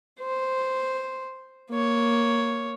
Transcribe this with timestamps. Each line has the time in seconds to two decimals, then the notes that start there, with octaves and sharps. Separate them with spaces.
0.20 C5
1.71 A#3 C#5